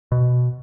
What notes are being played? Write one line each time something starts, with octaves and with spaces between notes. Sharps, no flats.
B2